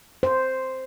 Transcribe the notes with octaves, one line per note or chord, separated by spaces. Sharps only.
C5